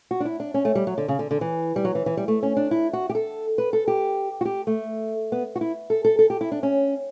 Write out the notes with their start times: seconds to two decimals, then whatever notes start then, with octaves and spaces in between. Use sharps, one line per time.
0.11 F#4
0.20 D4
0.25 E4
0.40 D4
0.54 C#4
0.65 A3
0.75 G3
0.87 F#3
0.98 D3
1.08 C#3
1.19 D3
1.31 D3
1.41 E3
1.76 G3
1.85 F#3
1.95 E3
2.06 E3
2.17 G3
2.28 A3
2.43 C#4
2.57 D4
2.71 E4
2.93 F#4
3.09 G4
3.15 A4
3.58 B4
3.73 A4
3.88 G4
4.41 F#4
4.45 G4
4.67 A3
5.32 B3
5.56 F#4
5.61 E4
5.90 A4
6.05 A4
6.19 A4
6.30 G4
6.41 E4
6.52 D4
6.63 C#4